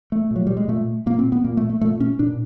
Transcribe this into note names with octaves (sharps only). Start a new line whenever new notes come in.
A3
A#2 F#3
G3
G#3
A#2 A3
A#2 A#3
C4
B3
A#2 A#3
A3
A3
A#2 A3
C#4
A#2 D4